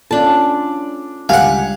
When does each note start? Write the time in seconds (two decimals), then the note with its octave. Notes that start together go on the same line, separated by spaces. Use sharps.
0.11 C#4 D4 F4 A4 A5
1.29 C#2 G3 G4 F5 F#5 G#5